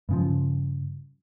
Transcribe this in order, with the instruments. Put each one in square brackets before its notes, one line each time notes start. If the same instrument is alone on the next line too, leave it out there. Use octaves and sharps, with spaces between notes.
[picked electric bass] G2 C#3 F3